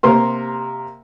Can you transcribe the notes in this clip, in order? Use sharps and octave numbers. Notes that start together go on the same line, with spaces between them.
C3 A#3 A#4 C6